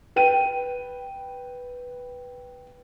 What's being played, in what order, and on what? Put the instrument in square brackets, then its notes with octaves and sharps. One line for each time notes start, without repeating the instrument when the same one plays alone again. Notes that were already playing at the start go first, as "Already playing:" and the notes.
[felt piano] B4 G5 D#7